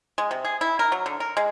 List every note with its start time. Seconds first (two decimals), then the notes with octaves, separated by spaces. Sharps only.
0.18 G#3
0.31 C3
0.45 G#4
0.61 E4
0.79 A#4
0.92 F#3
1.06 D3
1.20 A#4
1.37 G#3